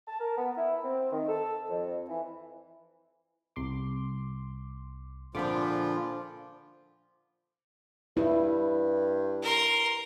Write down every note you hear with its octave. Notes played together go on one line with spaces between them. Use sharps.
A5
A#4
B3
E4
C4
D#3
A4
F2
E3
C2 C6 D6
A#2 D3 F3 D4 F4 C5 B5 D6
G2 E4
A#4 C6